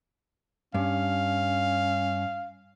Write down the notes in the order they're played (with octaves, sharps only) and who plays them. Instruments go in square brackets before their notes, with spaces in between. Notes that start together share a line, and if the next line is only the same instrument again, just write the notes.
[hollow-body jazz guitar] G2 [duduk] C#4 [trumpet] F5